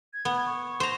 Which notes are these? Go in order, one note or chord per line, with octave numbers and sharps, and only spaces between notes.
G#6
B3
C#6
C5 A#5